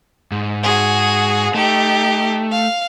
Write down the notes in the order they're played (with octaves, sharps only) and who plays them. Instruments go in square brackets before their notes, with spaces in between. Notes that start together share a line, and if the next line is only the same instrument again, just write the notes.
[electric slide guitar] G#2
[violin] F#4 G#4
[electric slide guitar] A3 [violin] D#4 G4
[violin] F5